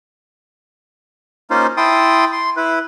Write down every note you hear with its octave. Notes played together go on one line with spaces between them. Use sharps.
A#3 C#4 D#4 F4 C5
E4 G5 A5 C6 D#6
C6
E4 B4